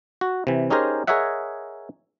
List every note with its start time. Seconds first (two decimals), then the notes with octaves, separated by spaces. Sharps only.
0.21 F#4
0.47 C3 E3
0.70 C#4 D#4 G4 G#4 A#4 C5
1.07 G#4 A#4 C#5 D#5 E5 F#5